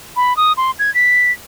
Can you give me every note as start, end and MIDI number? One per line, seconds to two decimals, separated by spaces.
0.16 0.36 83
0.37 0.53 87
0.57 0.71 84
0.79 0.93 92
0.95 1.31 95